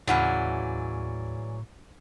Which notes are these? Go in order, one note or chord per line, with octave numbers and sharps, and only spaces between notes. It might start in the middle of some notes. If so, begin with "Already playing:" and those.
D#2 A2 C#3 E3 F#3 D5 F#5